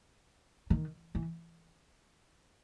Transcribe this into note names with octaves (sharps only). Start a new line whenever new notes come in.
D#3
E3